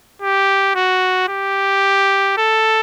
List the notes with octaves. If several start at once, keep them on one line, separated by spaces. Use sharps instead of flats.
G4
F#4
G4
A4